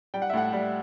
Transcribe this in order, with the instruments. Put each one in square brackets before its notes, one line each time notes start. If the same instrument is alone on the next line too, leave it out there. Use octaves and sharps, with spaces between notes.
[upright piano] G3 G5
F#5
E5
A2 F#5
G3